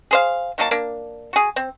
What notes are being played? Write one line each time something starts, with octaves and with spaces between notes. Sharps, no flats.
G#4 C5 F5
D#3 F#3 A#3 A5
A#3 D4
F#4 G#4
C4